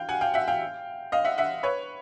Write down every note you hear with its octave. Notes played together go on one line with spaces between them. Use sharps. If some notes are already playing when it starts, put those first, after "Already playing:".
Already playing: F5 G5
F#5 G#5
F5 G5
E5 F#5
F5 G5
D#5 F5
E5 F#5
E5 F#5
B4 C#5